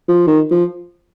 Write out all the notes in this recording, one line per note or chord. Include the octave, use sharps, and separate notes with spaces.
F3
D#3
F3